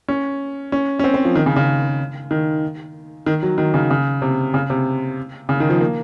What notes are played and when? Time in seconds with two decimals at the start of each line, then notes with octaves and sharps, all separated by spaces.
0.08 C#4
0.72 C#4
0.99 C#4
1.04 C4
1.14 C4
1.25 F3
1.36 D#3
1.46 C#3
1.56 C#3
2.31 D#3
3.26 D#3
3.43 F#3
3.58 D#3
3.74 C#3
3.90 C#3
4.22 C3
4.54 C#3
4.70 C3
5.49 C#3
5.60 D#3
5.70 F3
5.81 A#3